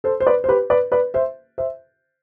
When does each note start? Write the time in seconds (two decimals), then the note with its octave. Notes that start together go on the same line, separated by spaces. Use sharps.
0.04 A4 C5
0.20 C5
0.27 B4 D5
0.44 C5
0.48 G4 B4
0.70 B4 D5
0.92 B4 D5
1.14 C5 E5
1.58 C5 E5